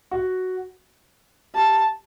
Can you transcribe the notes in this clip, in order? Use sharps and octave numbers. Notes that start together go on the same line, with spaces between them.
F#4
G4 A5